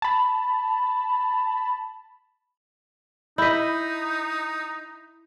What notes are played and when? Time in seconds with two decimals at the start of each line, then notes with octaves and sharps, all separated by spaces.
0.02 A5 B5
3.38 D#4 E4 D#5 G6 B6